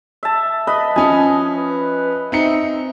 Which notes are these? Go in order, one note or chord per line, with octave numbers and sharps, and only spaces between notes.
E5 A5
B4 D#5 B5
F3 C#4 G#5
B4
C4 D#4 E5 C#7